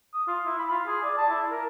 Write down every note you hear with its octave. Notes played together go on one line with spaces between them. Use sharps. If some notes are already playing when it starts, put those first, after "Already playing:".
D#6
F4
E4
B5
F4
G#4
D5
A5
E4
A#4